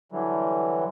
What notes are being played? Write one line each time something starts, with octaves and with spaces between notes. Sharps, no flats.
D3 E3 F#3 G3